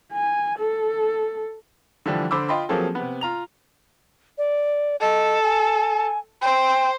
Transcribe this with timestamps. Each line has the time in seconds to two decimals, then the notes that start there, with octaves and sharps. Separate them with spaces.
0.12 G#5
0.58 A4
2.06 D3 E3 F3 G3 D4
2.31 D3 C5 B5 D6 E6
2.48 F4 D#5 F5 G5 B5 C6
2.69 F3 F#3 A#3 C4 G#4 A4
2.95 C3 B3
3.21 F4 A#5 F7
4.38 D5
5.01 A4 D#5
5.43 G#5
6.42 C5 G5